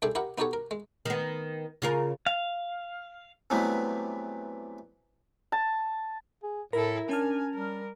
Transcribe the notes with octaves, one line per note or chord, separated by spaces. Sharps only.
C2 D4 G#4 A4 E5 G5
E4 G4 A#4 F#5
B3 D#4 F#4 G4 A4 C#5
A#4
G#3
D#3 B3
C#3 F4 A#4
F5
C3 E3 F#3 G3 A3 B3
A5
G#4
A2 E4 A4 A#4 B5
C#4 D4 G#5 A5 F6
G3 A#4